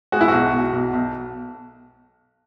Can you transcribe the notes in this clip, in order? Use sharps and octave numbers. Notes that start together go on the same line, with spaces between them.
G#3 F#4
E4
B1 F#4
B1
B1
B1